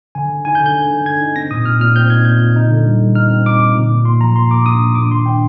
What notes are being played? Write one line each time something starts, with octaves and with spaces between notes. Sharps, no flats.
D3 G#5
D3
D#4 G#5
G6
D3
G6
D3
D3
D3 G#6
D#4
C4 A#6
A#2 D#6
A#2 F6
A#2 F6
C4 G6
D#4 G#6
A#2 G6
A#2
D#4
D3
G3
D3
D#4 F6
C4
D#4 D6
D#4 D6
A#2
A#2
A#3 C6
F3 A#5
A#3 C6
A#3 D6
D4 D#6
A#2
D4 D6
D#3 C6
D4 G5